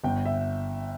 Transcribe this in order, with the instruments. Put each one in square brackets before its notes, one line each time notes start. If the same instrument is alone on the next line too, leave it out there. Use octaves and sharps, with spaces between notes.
[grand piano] G1 G5
E5